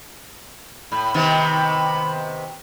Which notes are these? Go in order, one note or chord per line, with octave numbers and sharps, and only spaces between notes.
A2 B5
C3 D#3 B3